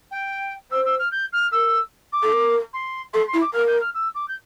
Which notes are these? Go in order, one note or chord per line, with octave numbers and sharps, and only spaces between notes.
G5
C5 E6
E6
F6
G6
F6
A#4 E6
D6
A4
A#4
C6
A4 C6
C6
E4
D6
A#4 F6
G6
F6
E6
D6
G6